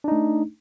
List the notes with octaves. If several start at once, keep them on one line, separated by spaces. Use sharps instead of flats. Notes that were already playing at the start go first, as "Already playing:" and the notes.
A3 D4 D#4